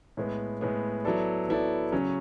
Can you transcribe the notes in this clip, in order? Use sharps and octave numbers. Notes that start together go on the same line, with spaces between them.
A2 G#3 B3
A2 G#3 B3
F#3 B3 E4 A4 D5
F#3 B3 E4 A4 D5
C#3 F#3 C#4